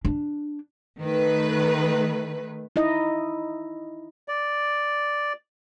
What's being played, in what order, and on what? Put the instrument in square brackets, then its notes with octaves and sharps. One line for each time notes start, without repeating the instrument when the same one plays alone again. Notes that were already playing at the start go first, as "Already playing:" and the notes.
[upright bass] D4
[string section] D#3 A3 B4
[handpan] D#4 E4 D#5
[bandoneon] D5